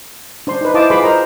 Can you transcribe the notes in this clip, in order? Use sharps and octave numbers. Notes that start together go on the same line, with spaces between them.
D4 C5 C6
D#4 B4
E4 C5 D#5 F5 A5 D6
F4 G#4 B4 B5 C6 D6
A#4 C5 D#5 A#5